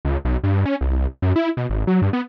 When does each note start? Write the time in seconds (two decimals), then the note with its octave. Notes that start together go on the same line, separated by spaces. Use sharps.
0.05 C#2
0.25 B1
0.43 G2
0.65 C#4
0.81 C2
1.22 F#2
1.36 E4
1.57 B2
1.70 G#1
1.87 F#3
2.02 G2
2.13 B3